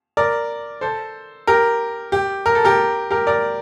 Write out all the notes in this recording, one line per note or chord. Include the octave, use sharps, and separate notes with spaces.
A#4 D5
A4 C5
G4 A#4
G4
A#4
A4
G4 A#4
G4 A#4
A#4 D5